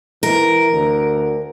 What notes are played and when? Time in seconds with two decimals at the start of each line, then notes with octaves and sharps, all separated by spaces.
0.23 E3 A#4
0.73 D2